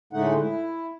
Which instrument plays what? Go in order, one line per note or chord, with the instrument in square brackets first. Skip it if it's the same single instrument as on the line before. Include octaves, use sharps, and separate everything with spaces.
[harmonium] A2 D3 G#3 A3 D#4 F#5
E4